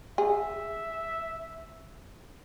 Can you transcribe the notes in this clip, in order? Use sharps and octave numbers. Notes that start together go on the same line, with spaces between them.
G#4 E5